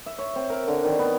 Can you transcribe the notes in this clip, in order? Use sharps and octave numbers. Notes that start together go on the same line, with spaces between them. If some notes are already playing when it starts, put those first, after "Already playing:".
E5
C#5
C4
A#4
D3
D#3
B3